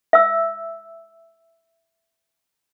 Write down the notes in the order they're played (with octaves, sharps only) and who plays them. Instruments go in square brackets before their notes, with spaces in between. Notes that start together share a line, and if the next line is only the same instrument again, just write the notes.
[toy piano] E5 E6